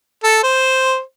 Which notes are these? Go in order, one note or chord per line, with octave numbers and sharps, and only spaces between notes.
A4
C5